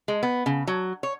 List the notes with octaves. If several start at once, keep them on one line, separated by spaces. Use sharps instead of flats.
G#3
B3
C#3
F#3
C#5